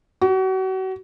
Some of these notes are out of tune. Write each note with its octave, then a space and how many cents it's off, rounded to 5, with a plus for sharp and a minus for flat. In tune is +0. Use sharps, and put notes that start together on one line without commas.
F#4 +35